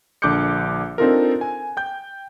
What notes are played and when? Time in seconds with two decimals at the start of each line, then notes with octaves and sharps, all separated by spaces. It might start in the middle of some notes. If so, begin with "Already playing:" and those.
0.22 A#1 D3 D6 F#6 G6 C#7
0.98 C4 D4 D#4 F4 A4 A#4
1.41 G#5
1.77 G5 G6